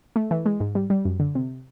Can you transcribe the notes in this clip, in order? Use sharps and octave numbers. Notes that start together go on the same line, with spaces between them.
A3
E3
G#3
G#2
G3
G3
F#2
D3
C3